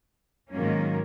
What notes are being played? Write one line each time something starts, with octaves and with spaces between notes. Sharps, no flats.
G#2 D#3 F#3 A#3 C#4